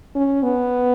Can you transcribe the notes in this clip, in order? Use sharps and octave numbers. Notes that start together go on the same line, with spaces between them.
C#4
B3